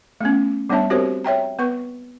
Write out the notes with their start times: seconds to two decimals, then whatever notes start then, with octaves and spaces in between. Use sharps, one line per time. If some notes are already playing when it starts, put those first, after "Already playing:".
0.21 A3 B3 C#4
0.69 G3 B3 D4 C#5 E5 A5
0.90 C4 F#4 G4 A#4 C5 C#5
1.24 C#5 E5 G5 A#5
1.59 B3 B4 C#6